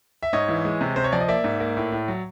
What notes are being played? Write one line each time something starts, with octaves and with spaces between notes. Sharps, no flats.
E5
G#2 C#5 D#5
E3
G#3
C3
C3 C5
C#5
F3 D5
D#5
A#3 D5 E5
G#2
A#3
A2
A2
F#3